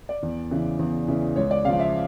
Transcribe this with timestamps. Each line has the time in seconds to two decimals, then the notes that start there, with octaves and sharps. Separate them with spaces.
0.09 D5
0.23 E2
0.51 C#3 E3
0.79 E2
1.08 C#3 E3
1.36 C#2 C#5
1.51 D5
1.64 C#3 F3 F5
1.80 E5